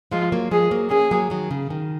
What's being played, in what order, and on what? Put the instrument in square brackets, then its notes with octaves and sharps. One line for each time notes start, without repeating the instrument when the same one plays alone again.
[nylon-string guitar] F3 G#3 [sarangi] F4
[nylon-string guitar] F#3 A#3
[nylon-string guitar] F3 G#3 [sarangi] G#4
[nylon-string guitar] F#3 A#3
[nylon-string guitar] A#3 C#4 [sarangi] G#4
[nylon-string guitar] F#3 A#3
D#3 F#3
C#3
D#3